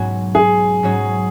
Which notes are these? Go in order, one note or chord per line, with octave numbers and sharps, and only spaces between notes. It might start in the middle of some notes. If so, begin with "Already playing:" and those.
Already playing: B1 G#2 F#3 B3 C#4 F#4
G#4
G#2 F#3 C#4 F#4